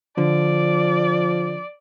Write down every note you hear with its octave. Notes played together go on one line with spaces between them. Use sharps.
D3 F3 D5